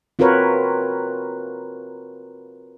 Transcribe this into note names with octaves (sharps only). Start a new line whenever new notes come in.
C4 F4 F#4 A#4 B4 C#5